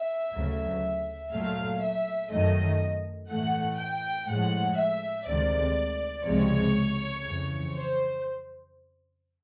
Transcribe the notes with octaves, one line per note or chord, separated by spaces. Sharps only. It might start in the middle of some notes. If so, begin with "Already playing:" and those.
Already playing: E5
D2 C#3 F#3
A#2 F#3 A3 F5
E5
F#2 D#3 F#3 A3 D#5
A2 E3 A3 F#5
G5
A2 F3 G#3 F#5
E5
D2 C3 D#3 G#3 D5
C#2 C3 F3 G#3 C#5
F2 C#3 E3
C5